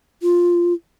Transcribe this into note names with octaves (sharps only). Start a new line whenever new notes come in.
F4